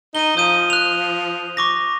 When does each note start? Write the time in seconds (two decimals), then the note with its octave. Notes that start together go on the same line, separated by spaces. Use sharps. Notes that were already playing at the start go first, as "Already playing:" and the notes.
0.15 D#4 D#7 G7
0.37 F3 D#6 G6 D#7
0.70 F#6 F7
1.57 C#6 D6 A#6